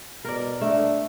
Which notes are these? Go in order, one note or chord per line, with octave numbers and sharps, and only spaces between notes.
B2 A#4 D5
A3 D4